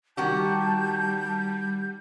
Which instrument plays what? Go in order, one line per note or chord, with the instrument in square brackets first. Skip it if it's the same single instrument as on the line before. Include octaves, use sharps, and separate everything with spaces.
[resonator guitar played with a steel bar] D#3 F#4 G4 [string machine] G3 [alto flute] A5 [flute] G6